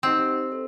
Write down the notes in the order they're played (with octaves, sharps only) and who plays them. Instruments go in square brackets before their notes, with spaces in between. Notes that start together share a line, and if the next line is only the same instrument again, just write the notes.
[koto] C4 [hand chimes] D#4 G4 C5 D#5 F#5
[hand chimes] A4 C5